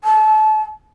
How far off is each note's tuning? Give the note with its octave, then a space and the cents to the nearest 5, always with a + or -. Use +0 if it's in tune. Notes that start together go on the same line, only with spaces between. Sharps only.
A5 -30